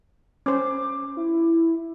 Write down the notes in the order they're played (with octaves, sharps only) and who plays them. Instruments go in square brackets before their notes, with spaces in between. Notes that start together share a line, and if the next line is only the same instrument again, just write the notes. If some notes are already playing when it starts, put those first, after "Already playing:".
[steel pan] C#4 C5 [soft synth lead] D6
[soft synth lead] E4